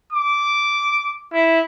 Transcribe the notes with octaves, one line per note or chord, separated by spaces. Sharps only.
D6
E4